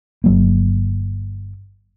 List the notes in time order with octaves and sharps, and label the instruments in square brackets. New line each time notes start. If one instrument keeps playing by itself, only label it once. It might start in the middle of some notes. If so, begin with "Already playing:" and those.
[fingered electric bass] G1 F#3 A#3